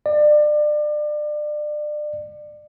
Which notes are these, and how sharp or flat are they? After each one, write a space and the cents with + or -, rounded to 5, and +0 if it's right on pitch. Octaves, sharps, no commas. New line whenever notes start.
D5 +30